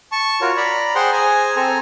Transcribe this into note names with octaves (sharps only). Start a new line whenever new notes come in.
A5 C#6
F4 F#4 A#4 C#5
D5 A#5 B5
G#4 C5 F#5 G5 C6
G#4 C5 G#5 A#5
C4 A4 C5 G#5 A#5